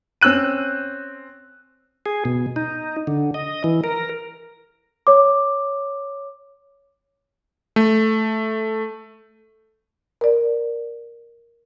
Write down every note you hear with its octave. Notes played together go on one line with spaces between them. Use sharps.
C4 C#4 E6 F#6 D#7
G#4
B2
D#4
D3
D#5
E3
A#4
C#5 D6
A3
A#4 D5